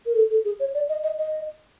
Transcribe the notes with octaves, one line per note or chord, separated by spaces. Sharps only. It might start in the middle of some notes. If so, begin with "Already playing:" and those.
A#4
A4
A4
G#4
C#5
D5
D#5
D#5
D#5